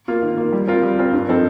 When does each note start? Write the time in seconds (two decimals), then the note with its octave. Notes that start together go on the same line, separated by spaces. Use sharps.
0.08 A#3 F4
0.23 D#3
0.38 A#3 F4
0.53 G3
0.67 C4 F4 A#4
0.83 G3
0.98 C4 F4 A#4
1.13 G2
1.28 F3 C4 D#4 A4